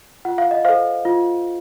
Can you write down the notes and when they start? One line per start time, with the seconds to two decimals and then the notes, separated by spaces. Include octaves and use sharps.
0.25 F4 F#5
0.38 F5
0.51 D#5
0.65 A4 C5 F5
1.05 F4